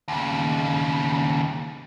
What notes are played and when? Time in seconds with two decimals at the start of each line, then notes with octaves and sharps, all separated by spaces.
0.08 D#2 C#3